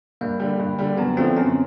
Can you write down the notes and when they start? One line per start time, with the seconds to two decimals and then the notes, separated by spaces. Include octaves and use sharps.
0.21 G2 A#3
0.40 D3 G3
0.59 G2
0.79 D3 G3
0.97 F#2 B3
1.17 D3 F3 A3 C4
1.37 F#2 C#4